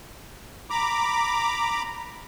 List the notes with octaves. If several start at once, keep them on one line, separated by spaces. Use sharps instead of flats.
A#5 B5 D6